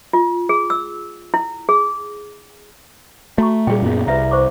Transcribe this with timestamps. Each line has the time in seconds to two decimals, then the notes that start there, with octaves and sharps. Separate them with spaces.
0.13 F4
0.49 G#4
0.70 E6
1.34 E4
1.69 G#4
3.38 A3 F#4 A#5 C#6
3.67 A#2 G3 G#4 G5
3.82 F#2 A#2 B3
4.07 C2 B4 E5 A#5
4.31 C5 C#6 D6